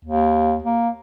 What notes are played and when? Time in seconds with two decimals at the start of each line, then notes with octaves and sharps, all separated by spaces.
0.05 D#2
0.64 A#3